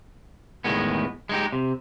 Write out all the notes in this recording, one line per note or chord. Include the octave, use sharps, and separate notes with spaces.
E2 A2 C3 D#3 G#3 B3
G#3 D#4 G4
C3